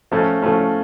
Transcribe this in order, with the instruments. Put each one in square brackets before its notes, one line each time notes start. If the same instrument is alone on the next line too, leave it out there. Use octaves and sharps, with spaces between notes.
[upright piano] F3 A3 C#4
F3 A3 C#4